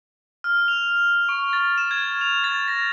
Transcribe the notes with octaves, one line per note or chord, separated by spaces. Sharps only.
F6
F7
C#6
A6
E7
G#6
F7
A6
A#6